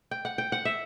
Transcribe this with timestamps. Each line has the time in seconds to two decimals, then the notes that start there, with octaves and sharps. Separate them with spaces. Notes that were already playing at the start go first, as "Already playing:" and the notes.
0.11 G5
0.25 F#5
0.38 G5
0.52 F#5
0.65 E5